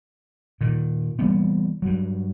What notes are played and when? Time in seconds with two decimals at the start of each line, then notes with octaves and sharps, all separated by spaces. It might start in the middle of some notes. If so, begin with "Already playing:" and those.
0.61 A#2 D#3
1.19 E3 G3 A#3 B3
1.82 G2 F#3